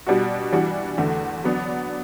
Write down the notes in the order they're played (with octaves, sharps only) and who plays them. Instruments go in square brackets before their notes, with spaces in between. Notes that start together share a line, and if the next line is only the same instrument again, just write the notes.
[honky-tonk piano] B2 G3 D4 F#4
E3 G3 D4 F#4
E2 D3 A3
F#3 B3 D4